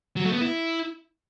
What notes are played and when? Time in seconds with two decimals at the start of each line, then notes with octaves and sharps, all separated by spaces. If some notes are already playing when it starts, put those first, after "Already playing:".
0.16 F#3
0.25 A3
0.33 B3
0.41 E4